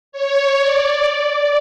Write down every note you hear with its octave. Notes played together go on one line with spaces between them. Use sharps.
C#5
D5